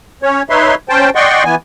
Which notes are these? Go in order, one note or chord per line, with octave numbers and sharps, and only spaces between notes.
C#4 C#5
D#4 B4 C#5 E5 C6
C#4 C5 G5 A5
D5 D#5 F#5 G5 C6 C#6
E3 B3 G#5